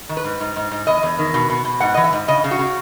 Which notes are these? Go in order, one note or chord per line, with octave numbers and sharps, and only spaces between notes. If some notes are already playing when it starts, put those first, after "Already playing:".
D#3
B4
G#2
G#2
G#2
G#2
E2 D#5
E2
D#3
B2
B2
B2
G#2 F#5
E3 D#5
E5
G#2
C#3 D#5
C#3
F#4
C#3